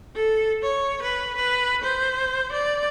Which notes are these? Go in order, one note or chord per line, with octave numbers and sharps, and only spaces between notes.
A4
C#5
B4
B4
C5
D5